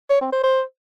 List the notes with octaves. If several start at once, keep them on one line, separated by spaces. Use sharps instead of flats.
C#5
C4
C5
C5